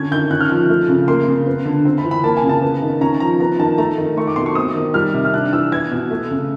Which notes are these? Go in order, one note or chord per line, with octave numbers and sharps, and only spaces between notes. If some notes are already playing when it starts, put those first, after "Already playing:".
Already playing: D3 C#4 G#6
D#3 G6
C#4 F#6
F6
F3 F#6
A3
C#3
A#3 C6
C#3
B3
D3
C4
B5
E3
B5
A#3 A5
G#5
C#3
A5
B3
D#3
C#4 A#5
F3 A#5
B3 A#5
D#3 A5
A3 A#5
D#3
A3 C#6
D6
B2 C6
C#6
C4 D#6
D#3
G3 F6
C3
F6
D4 F#6
E3 E6
B3 G#6
B2
A3
C#3